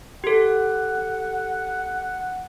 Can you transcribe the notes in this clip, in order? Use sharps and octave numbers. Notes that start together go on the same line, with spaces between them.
G4 A4 F#5